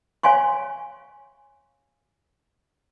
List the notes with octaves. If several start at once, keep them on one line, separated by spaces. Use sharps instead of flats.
C#5 F5 G#5 C6 C#6